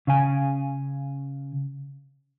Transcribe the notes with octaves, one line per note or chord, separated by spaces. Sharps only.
C#3 F5 G#5